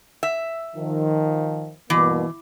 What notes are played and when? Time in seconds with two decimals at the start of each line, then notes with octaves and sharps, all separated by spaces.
0.23 E5
0.75 D#3 F3
1.90 G2 B2 E3 A#3